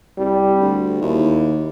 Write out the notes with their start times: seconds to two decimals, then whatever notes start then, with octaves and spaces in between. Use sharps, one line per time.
0.18 C2 G3
0.61 D2
1.01 D#2 E4